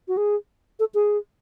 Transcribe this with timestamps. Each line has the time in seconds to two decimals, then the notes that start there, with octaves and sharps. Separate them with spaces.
0.08 F#4
0.17 G#4
0.79 A4
0.94 G#4